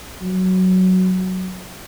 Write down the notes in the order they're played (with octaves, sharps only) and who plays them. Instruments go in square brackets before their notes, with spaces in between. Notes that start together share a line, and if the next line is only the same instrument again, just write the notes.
[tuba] F#3